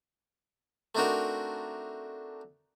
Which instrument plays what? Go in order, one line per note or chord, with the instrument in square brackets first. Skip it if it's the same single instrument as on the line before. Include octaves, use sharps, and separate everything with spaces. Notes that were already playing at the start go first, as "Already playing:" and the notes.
[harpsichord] A3 C4 D4 D#4 F#4 A#4